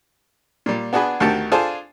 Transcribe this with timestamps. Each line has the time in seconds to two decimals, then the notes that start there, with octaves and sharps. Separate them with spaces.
0.66 A#2 G3
0.93 B3 D4 F#4 G#4 B4
1.20 D2 D#3 G4 F#5 A5
1.52 D4 F4 G#4 A4 C5